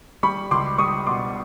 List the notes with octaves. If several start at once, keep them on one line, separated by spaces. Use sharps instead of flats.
G3 B5 C#6
C#2 C6 D6
G3 C#6 D#6
B2 C6 D6